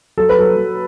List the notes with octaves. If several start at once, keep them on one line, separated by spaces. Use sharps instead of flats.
F#3 A4
B4
F#3 A4
F#3